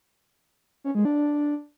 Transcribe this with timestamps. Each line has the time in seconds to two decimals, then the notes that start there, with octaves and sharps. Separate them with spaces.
0.84 C#4
0.95 G#3
1.05 D4